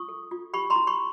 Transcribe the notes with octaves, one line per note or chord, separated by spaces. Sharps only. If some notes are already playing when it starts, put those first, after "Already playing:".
Already playing: F4 C#6 D#6
A4
F4
G4 B5 C#6
A#5 C6
E4
B5 C#6